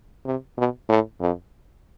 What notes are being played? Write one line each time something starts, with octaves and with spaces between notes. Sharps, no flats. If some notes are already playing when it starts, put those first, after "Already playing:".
C3
B2
A2
F2